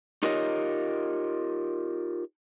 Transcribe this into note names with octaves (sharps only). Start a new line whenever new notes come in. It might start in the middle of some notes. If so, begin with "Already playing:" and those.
D#4 F4 G4 A#4 C#5 D#5